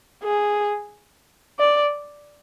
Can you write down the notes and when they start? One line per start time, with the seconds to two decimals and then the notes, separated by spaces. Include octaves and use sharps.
0.23 G#4
1.59 D5